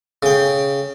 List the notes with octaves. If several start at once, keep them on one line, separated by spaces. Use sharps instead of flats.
C#3 G5